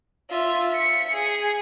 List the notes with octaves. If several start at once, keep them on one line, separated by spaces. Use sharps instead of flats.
F4 E5
B6 C#7
G#4